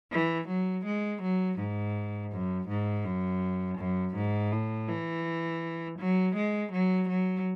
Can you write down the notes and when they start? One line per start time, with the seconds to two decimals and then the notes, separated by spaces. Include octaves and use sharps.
0.11 E3
0.48 F#3
0.84 G#3
1.22 F#3
1.58 G#2
2.31 F#2
2.68 G#2
3.05 F#2
3.78 F#2
4.15 G#2
4.51 A2
4.88 E3
5.98 F#3
6.35 G#3
6.72 F#3
7.08 F#3